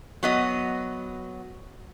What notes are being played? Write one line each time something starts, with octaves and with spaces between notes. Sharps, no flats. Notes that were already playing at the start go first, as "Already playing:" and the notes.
F#3 B3 D#5